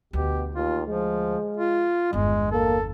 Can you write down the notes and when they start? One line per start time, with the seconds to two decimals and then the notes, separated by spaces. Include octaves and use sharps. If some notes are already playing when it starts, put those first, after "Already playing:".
0.13 D2 B2 G4
0.55 D#2 F4
0.87 F3 G#3
1.57 F4
2.13 G1 E2 G#3
2.52 A#3 A4